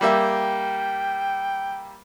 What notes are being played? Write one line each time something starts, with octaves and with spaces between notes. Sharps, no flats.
G3 A#3 E5 G5